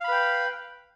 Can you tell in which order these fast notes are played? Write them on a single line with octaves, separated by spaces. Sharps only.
F5 B5 B4 G5